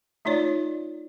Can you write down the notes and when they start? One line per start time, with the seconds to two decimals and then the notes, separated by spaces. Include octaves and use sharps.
0.25 A3 D#4 F4 C#5 D5